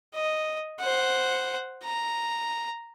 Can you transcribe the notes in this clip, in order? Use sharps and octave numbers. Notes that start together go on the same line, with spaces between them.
D#5
C5 F#5
A#5